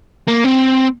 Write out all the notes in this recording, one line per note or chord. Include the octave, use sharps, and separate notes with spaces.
A#3
C4